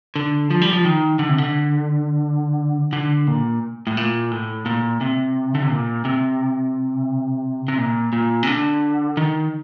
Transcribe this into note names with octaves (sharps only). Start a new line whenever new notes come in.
D3
F3
G3
F3
D#3
D3
C3
D3
D3
A#2
A2
A#2
A2
A#2
C3
D3
C3
A#2
C3
C3
A#2
A#2
C3
D3
D#3